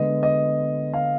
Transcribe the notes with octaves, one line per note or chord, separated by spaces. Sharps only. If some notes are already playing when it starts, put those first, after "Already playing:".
Already playing: D3 G#3 B3 D#5
D#5
F5